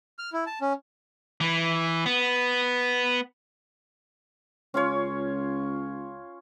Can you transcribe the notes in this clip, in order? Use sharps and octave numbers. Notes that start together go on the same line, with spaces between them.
F6
E4
A5
C#4
E3
B3
C#2 C#4 F4 C#5